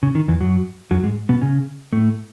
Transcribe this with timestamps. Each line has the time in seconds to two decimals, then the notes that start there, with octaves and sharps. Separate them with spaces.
0.03 C#3
0.15 D#3
0.28 E2 E3
0.41 F#2 F#3
0.91 F#2 F#3
1.03 G#2 G#3
1.29 B2 B3
1.41 C#3 C#4
1.93 A2 A3